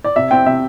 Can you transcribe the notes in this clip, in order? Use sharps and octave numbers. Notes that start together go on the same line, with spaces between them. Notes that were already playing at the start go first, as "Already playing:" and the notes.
D5
C3 E5
C4 G5
C3 E5